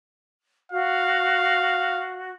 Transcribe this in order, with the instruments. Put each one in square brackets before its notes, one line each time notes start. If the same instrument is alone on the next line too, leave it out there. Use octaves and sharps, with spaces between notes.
[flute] F#4 [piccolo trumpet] F5